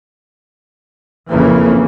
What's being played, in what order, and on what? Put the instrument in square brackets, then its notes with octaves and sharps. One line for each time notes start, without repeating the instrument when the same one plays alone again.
[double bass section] F2 C#3 E3 A#3